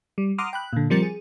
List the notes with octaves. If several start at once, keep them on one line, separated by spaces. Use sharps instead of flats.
G3
F#5 A#5 C6 D6 D#6 F6
G5 B5 F#6
A#2 D3
F3 G3 C4 A#4 A6 C#7
G#4